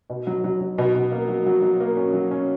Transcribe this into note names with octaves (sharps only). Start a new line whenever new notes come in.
B2
F#3
F#3
F#3
B2
B2
A#3
F#3
F#3
F#3
A#3
C#4
F#3
C#4